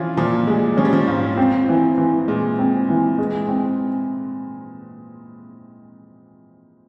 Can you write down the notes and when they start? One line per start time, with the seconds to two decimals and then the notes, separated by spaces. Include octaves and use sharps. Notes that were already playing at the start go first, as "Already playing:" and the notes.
Already playing: E3 F3 C#4 F4
0.17 A#2 F3
0.47 G3 G#3
0.77 F3 C#4
0.85 G3
0.93 F3
1.08 G#2 F4
1.37 C4
1.68 E3
1.98 E3
2.28 A#2 G#3
2.59 C4
2.89 E3
3.18 G#3
3.48 C4